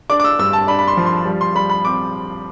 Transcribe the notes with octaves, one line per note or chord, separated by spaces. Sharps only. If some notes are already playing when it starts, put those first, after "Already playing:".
D4 D6
D6
E6
G2 E6
A5
D4 B5
B5
C6
F3
C6
G3
C6
G3 B5
B5
C4 D6